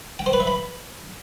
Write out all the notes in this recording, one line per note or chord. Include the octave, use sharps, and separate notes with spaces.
G5
C5
B4
E5
B5